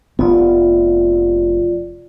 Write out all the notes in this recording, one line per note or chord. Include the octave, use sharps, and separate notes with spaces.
F1 B3 F4 D5